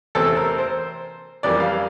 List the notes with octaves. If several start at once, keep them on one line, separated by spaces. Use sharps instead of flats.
E2 C3 E3 A3 C4 A4
A#4
C5
F2 E3 G3 A#3 D5
F5